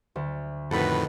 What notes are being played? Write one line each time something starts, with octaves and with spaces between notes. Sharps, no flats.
D2
F2 A2 D#3 D#4 F#4 A4 B4 B5